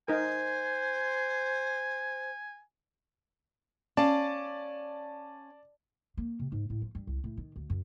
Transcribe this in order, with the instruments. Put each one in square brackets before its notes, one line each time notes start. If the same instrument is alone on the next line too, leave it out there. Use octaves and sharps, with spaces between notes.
[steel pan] D#4 A#4 [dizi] C5 [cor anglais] G#5
[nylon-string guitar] C#4 F5 [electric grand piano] D5 A5
[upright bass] A#3
C3
G#2
A2
F3
G2
C2
A2
D#3
D2
F#2